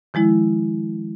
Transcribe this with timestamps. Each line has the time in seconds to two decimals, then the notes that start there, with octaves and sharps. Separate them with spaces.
0.14 D#3 F3 G#3 E4